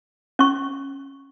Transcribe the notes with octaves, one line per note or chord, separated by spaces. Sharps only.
C#4 C#6